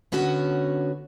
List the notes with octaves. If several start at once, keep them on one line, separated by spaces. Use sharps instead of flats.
D3 B3 C#4 F#4 C#5